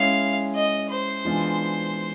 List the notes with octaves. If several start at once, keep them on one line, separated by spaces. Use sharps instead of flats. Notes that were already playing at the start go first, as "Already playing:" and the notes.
Already playing: G#3 C#4 E4 F5
D#5
C5
E3 G#3 B3 D4 F4